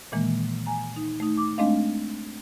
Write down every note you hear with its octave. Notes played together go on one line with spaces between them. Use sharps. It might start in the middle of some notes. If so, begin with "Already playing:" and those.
A#2 D#3 E3 G#3 A#3
G#5 A#5
D#4
A3 D#4
D6
G#3 A3 C4 D4 D#5 F5